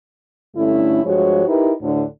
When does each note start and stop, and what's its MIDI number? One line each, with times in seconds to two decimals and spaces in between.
0.56 1.00 43
0.56 1.00 50
0.56 1.00 57
0.56 1.00 61
0.56 1.00 64
1.04 1.44 43
1.04 1.44 53
1.04 1.44 56
1.04 1.44 66
1.04 1.44 73
1.47 1.72 63
1.47 1.72 64
1.47 1.72 67
1.47 1.72 70
1.47 1.72 71
1.82 2.03 38
1.82 2.03 45
1.82 2.03 50